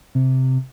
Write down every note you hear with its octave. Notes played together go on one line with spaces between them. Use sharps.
C3